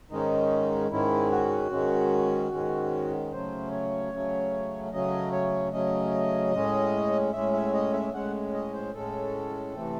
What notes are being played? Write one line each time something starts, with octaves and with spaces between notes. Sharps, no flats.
G#2 D#3 G#3 C#4 D#4
G#2 D#3 G#3 C#4 E4
F#4
G#2 D#3 G#3 C#4
G#2 D#3 G#3 C#4
C#3 F#3 A3 C#4 C5
C#5
C#3 F#3 A3 C#4
C#3 F#3 A3 C#4 D#5
C#5
C#3 F#3 A3 C#4 D#5
A2 G#3 C#4
A2 G#3 C#4 E5
E5
D#5
E5
A2 G#3 C#4 F#5
D#5
C5
A2 G#3 C#4 A4
C3 E3 A3 C4